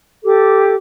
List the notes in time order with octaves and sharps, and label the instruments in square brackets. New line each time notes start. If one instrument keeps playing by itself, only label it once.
[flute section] G4 A4 D6